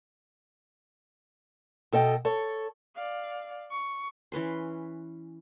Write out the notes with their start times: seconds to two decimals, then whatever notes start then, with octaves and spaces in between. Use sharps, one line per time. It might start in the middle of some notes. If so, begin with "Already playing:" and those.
1.93 B2 A4 D#5 G5
2.25 A4 C#5
2.95 D5 F5
3.71 C#6
4.32 E3 C#4 B4 C6